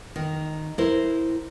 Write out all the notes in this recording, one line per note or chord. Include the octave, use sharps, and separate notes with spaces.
D#3
E4 A#4 C5